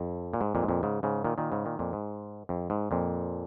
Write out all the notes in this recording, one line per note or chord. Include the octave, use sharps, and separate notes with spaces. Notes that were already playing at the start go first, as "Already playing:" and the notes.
Already playing: F2
A#2
G#2
F2 A#2
G#2
F2 A#2
G#2 C#3
G#2 C#3
A#2 D#3
A#2 D#3
G#2 C#3
A#2 D#3
F2 A#2
G#2
F2
G#2
F2 A#2